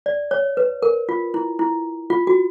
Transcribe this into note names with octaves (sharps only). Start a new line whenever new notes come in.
D5
C#5
B4
A#4
F4
E4
E4
F4
F#4